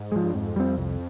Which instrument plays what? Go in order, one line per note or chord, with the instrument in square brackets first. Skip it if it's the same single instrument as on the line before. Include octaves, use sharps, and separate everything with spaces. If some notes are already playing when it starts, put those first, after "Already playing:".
Already playing: [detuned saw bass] G#2
[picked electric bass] F3 G#3
[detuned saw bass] G2
[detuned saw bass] F2 [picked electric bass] G#2
[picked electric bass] G3 C4
C2